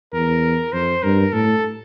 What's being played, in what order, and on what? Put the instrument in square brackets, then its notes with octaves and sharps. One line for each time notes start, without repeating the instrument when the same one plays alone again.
[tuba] E2 [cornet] A#4
[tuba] F2 [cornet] C5
[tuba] G2 [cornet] A#4
[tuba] A2 [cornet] A4